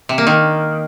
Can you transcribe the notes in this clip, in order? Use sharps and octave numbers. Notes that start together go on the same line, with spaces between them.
C3
A#3
D#3